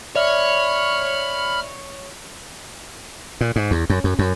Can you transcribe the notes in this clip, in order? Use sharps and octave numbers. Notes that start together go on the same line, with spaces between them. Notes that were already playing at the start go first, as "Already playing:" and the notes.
C#5 D5 E5 B5 F6
A#2
G#2
E2
F#2
F#2
F#2